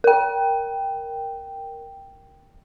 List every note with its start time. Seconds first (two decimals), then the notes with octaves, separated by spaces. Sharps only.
0.04 A#4 G5